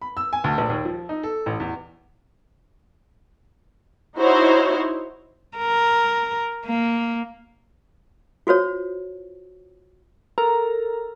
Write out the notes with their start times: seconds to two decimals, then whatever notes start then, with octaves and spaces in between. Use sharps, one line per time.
0.02 B5
0.17 E6
0.33 G#5
0.44 D2
0.58 A#1
0.70 D#2
0.85 F3
1.09 D#4
1.23 A4
1.46 A1
1.60 E2
4.17 D#4 E4 F#4 C5 C#5
5.57 A#4
6.66 A#3
8.47 F4 F#4 C5 C#5
10.38 A4 A#4 A#5